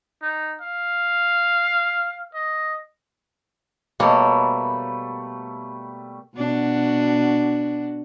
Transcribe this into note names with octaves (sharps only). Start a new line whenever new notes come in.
D#4
F5
D#5
B2 G3 A3 A#3 C#5
B2 D4 F#4